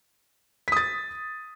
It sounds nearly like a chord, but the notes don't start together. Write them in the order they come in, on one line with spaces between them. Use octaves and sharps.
B6 D#6 A6